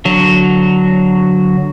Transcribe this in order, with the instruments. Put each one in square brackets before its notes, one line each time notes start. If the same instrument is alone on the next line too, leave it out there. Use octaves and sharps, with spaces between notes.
[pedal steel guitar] D3 F#3